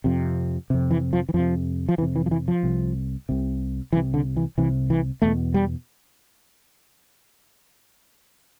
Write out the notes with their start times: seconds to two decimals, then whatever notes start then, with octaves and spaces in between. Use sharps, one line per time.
0.04 F2 C3
0.70 F2 C3
0.91 E3
1.13 F3
1.29 E3
1.34 F2 C3 F3
1.89 F3
1.98 F2 C3 E3
2.16 E3
2.26 F3
2.31 E3
2.48 F3
2.63 C2 C3
3.29 C2 C3
3.93 C2 C3 E3
4.14 D3
4.37 E3
4.58 C2 C3 E3
4.90 E3
5.22 E2 B2 A3
5.54 G3